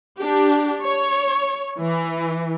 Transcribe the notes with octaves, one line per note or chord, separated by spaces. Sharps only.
D4 G4
C#5
E3